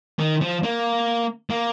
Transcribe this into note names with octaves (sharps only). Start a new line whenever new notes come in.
D#3
F3
A#3
A#3